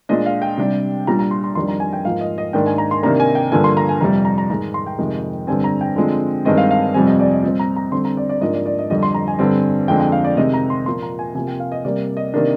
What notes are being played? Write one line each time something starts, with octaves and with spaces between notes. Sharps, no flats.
A#2 G#3 D4 D#5
F5
G5
C3 G3 D4
A#2 G3 D4 A#5
A#5
C6
C6
F2 D#3 G3 D4 C6
A#5
G#5
G5
G#2 F3 A#3 F5
D#5
D#5
G#2 D#3 A#3 D4 G5
G#5
A#5
C6
C3 D#3 A#3 D4 A#5
G#5
G5
G2 D3 F3 A#3 G#5
C6
A#5
G#5
F2 C3 G3 A#5
A#5
A#5
G#2 D#3 G#3 A#5
C6
G5
F2 C3 D#3 G#3
G2 D3 G3 C4 G#5
A#5
G5
D3 F3 G#3 C4
G2 D#3 G#3 C4 D#5
F5
F5
F2 C3 G3 C4 G#5
D#5
D5
D#5
A#2 G3 C4 D#5
A#5
A#5
D3 G3 C4 C6
A#5
D5
D5
G#2 F3 A#3 D4 D#5
D5
D5
D#5
F2 D3 G3 D#5
C6
A#5
G#5
G2 D3 G3 C4
F2 D3 G#3 C4 G5
G5
F5
D5
C3 D#3 G#3 C4 D#5
A#5
C6
A#2 F3 A#3 C6
A#5
G#5
C3 F3 A#3 G#5
G5
F5
D#5
C3 G3 A#3 D5
D#5
C3 D#3 A#3 D4